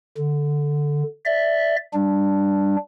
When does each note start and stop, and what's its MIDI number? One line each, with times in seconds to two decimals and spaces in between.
0.18 1.03 50
1.26 1.76 74
1.26 1.76 76
1.94 2.76 55
1.94 2.76 62